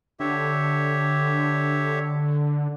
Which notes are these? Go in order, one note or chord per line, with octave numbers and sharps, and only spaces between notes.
D3 G4 C#5 E5